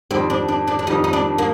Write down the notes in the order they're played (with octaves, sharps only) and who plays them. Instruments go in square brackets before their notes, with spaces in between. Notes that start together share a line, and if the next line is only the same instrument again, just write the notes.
[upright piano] F2 D#3 G3 [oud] C4
[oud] D4
D4
D4
D4
[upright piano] F2 D#3 G3 [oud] D#4
[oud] D#4
D4
A#3